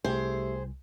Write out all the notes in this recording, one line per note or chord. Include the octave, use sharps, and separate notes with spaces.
C2 A3 G4 G#4 C5